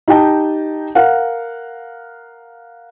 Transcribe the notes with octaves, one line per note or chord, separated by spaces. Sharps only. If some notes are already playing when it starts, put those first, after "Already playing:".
D#4 G4 D#5 G5 A5
A#4 F5 F#5